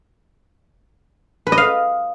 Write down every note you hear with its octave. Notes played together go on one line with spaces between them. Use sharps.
B4
D#5
F5